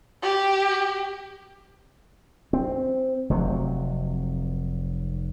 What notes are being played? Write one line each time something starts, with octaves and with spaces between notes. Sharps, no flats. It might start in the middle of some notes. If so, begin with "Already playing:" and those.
G4
C4
F1 C3 F#3